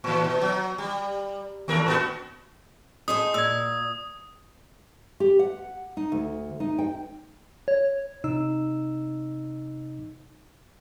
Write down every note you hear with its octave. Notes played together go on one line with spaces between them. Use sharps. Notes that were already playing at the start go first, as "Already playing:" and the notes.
A2 E3
B2
F#3
G3
D#2 A3 A#4
A2 B3 F#4
D#4 G#4 C5 D#6
A#2 E6 G#6
G4
F#5
D#4
D2
D#4
G5
C#5
C3 D#4 E6